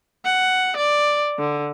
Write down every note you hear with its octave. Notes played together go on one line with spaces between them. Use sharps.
F#5
D5
D3